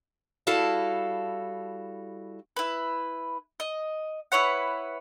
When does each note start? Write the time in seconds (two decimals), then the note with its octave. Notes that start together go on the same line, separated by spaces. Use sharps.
0.47 G3 E4 F#4 A4 F5 A5
2.56 E4 B4
3.60 D#5
4.32 E4 B4 C#5 F#5